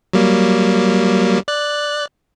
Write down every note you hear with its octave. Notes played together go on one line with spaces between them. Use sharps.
F#3 G3 A#3
D5 F#6